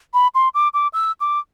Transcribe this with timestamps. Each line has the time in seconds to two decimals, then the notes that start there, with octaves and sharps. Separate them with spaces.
0.14 B5
0.35 C6
0.55 D6
0.74 D6
0.93 E6
1.21 D6